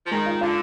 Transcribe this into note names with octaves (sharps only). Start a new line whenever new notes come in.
F3
D#3 G#3
F4
D3 F4